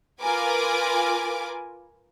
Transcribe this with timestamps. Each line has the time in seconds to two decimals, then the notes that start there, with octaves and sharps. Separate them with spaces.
0.21 F4 A#4 B4 G#5 D6